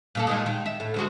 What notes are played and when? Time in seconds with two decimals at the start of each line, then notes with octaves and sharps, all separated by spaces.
0.15 A#2 A#3 A4
0.27 A#2 D#3 G#3
0.46 D#3
0.66 E5
0.80 A2
0.94 D2 G#3 F#4